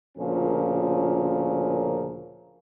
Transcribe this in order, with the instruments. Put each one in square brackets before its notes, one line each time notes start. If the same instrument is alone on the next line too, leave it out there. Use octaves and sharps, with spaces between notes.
[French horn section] D2 A#2 C#3 F3 C#4 A#4